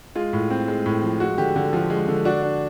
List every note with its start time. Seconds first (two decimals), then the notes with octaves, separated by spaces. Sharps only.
0.15 G#3 F4
0.33 A2
0.50 C4
0.68 G#3
0.86 A2
1.02 F3
1.20 G#3 F#4
1.38 D3 G4
1.56 D3
1.73 F3
1.90 G#3
2.08 D3
2.25 D4 F#4
2.42 D4